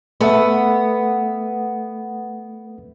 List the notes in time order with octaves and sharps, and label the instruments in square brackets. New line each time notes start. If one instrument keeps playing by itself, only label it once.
[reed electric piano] A3 A4 E5 [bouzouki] B3